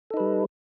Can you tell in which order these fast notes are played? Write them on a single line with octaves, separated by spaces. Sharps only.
A4 D#4 B4 G3